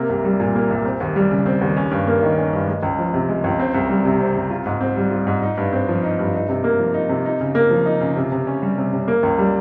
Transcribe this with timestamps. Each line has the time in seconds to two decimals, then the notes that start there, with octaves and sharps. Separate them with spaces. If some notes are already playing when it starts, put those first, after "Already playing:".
Already playing: C3 A#3
0.09 C2
0.24 G3
0.40 A#2
0.55 A#3
0.70 C2
0.85 C4
1.00 D#2
1.16 G3
1.31 C#3
1.46 C4
1.61 D#2
1.76 C#4
1.91 G2
2.07 A#3
2.23 D#3
2.37 C#4
2.53 G2
2.67 G#3
2.83 C#2
2.99 F3
3.14 C3
3.29 G#3
3.44 C#2
3.60 C4
3.74 C2
3.90 G3
4.05 C3
4.20 C4
4.35 C2
4.50 F4
4.66 G#2
4.81 C4
4.97 G3
5.11 F4
5.27 G#2
5.42 D#4
5.57 G2
5.73 C4
5.88 F3
6.03 D#4
6.19 G2
6.34 D#4
6.49 C3
6.64 A#3
6.79 F3
6.94 D#4
7.09 C3
7.25 D#4
7.40 C#3
7.55 A#3
7.71 F3
7.86 D#4
8.01 C#3
8.16 C3
8.32 C3
8.47 C#4
8.62 G3
8.78 C3
8.93 C3
9.08 A#3
9.23 C#2
9.38 G3